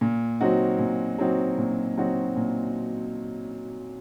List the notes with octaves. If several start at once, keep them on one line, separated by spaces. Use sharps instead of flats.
A#2
F#3 C4 D#4 F#4
A#2
F#3 C4 D#4 F#4
A#2
F#3 C4 D#4 F#4
A#2